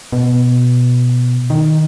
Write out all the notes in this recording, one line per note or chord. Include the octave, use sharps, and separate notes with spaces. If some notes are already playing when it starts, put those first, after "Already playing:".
B2
D#3